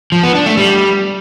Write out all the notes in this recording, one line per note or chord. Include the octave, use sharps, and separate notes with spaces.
F3
B3
D4
A3
G3